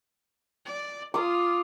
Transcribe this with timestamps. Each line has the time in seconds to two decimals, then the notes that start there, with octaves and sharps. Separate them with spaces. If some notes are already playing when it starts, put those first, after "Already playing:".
0.66 D5
1.14 F4 D6 D#6